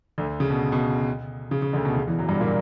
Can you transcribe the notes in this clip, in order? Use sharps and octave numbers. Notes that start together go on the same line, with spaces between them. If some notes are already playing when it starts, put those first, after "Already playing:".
D2 D3
C#3
B2
B2
C#3
C#3
D2 D3
B2
C#3
E2 E3
F#2 F#3
G2 G3
A#2 A#3